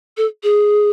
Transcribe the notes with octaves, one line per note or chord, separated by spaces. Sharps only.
A4
G#4